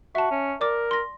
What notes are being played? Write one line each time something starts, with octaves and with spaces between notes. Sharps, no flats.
F#4 E5 A5
C#4
A#4 D5 D6
C6 A#6